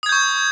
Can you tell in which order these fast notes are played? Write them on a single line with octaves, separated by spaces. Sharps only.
D#6 G#6 G6 C#6